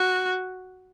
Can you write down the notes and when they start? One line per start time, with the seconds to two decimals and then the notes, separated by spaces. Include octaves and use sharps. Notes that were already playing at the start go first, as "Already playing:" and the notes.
Already playing: F#4